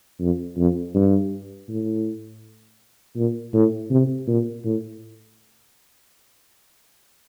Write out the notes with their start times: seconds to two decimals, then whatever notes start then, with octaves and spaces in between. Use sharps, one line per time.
0.20 F2
0.58 F2
0.94 G2
1.69 A2
3.16 A#2
3.54 A2
3.91 C3
4.27 A#2
4.65 A2